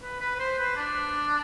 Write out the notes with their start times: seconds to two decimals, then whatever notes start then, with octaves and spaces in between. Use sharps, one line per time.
0.02 B4
0.21 B4
0.35 B4
0.39 C5
0.58 B4
0.76 D4